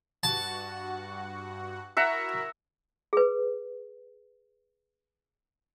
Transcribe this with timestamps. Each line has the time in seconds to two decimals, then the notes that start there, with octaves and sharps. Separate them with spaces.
0.23 G2 F#4 F#5 A5
1.97 E4 F#4 A#4 E5 F#5 A#5
3.13 G#4 B4